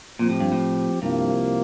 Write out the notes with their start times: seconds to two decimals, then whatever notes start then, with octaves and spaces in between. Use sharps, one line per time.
0.19 A#2 F3 C4 G4
0.30 A2
0.40 G2
0.52 A2
1.01 C2 G2 C3 F3 A#3